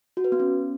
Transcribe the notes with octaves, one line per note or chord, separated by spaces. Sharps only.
F#4
B4
B3
C#4